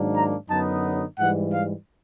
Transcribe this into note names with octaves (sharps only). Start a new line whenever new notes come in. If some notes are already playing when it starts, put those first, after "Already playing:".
Already playing: G#2 D#3 F#3 A#3 D4
A#5
F#2 D3 F#3 B3 D#4 A5
G#2 E3 G3 F#5
F5